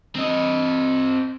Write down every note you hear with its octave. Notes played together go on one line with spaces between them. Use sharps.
C4 D#5